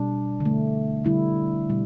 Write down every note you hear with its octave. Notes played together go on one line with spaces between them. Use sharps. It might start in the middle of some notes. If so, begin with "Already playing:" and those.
Already playing: B2 G3 D4
D3
A3
D3 G3 E4
B2 G3